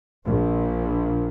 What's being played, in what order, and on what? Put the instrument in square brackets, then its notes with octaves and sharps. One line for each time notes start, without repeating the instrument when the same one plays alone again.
[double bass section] A#1